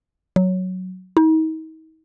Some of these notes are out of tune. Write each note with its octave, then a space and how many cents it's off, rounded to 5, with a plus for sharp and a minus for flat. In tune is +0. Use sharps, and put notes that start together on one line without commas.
F#3 +0
D#4 +40